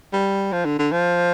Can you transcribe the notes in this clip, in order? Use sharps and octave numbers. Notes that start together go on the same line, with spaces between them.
G3
F3
D3
D3
F3